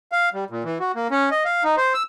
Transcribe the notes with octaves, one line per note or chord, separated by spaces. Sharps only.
F5
G3
A#2
E3
F#4
A#3
C#4
D#5
F5
D#4
C5
E6